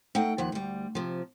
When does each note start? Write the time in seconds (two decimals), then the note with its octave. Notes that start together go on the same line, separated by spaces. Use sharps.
0.15 A3 D#4 F#5 G5
0.38 D#2 F3 F#5
0.52 D2 G3
0.95 C3 F3